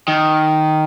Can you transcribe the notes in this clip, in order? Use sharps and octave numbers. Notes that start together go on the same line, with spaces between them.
D#3